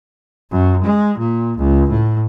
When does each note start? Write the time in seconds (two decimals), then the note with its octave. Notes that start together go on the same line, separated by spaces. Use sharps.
0.51 F#2
0.84 G#3
1.18 A#2
1.58 C#2
1.90 A2